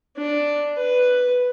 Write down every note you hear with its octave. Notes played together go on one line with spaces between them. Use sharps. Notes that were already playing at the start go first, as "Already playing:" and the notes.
D4
B4